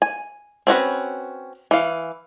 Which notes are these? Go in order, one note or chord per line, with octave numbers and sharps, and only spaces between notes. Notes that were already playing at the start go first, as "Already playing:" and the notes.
G#5
C4 C#4 F#4 B4
E3 F5